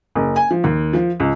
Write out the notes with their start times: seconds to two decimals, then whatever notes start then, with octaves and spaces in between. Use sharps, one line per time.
0.15 F#1
0.36 G#5
0.51 F3
0.64 D#2
0.93 F3
1.20 C#2